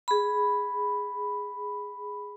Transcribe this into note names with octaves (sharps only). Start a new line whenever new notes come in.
G#4 B5